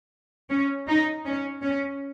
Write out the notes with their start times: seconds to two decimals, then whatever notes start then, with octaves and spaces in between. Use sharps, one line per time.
0.50 C#4
0.88 D#4
1.26 C#4
1.63 C#4